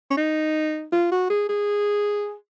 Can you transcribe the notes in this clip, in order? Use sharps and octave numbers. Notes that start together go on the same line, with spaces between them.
C#4
D#4
F4
F#4
G#4
G#4